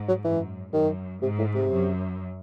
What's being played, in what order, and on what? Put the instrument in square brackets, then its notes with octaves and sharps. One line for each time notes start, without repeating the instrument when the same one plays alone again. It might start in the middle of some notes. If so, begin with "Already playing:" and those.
Already playing: [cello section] G#2
[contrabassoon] F#3
[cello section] F#2 [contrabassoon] E3
[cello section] F#2 [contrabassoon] D#3
[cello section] G#2 [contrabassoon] C3
[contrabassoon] A2
C3
[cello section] F#2